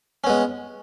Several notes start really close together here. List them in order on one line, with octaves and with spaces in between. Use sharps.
C#4 B3 G#3